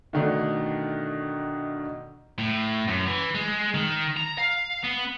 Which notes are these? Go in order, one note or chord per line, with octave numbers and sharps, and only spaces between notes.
B2 D3 D#3 A3 D4 D#4
A2
F#2
E3
G#3
D#3
A#5
F5
B3